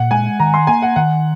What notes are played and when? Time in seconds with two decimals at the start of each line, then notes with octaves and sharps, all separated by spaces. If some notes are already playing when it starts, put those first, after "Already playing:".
Already playing: A#2 F#5
0.11 G#3 G#5
0.40 D#3 A#5
0.54 C6
0.67 A#3 G#5
0.82 F#5
0.96 D#3 F#5